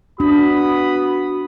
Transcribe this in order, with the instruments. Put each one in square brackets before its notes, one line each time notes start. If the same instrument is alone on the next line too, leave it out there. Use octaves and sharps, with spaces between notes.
[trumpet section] B3 B5 D#6 [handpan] D4 [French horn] F#4